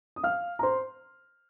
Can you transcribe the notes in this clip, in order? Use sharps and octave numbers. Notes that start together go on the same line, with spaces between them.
D#6
F5 F6
A#5
C5 C6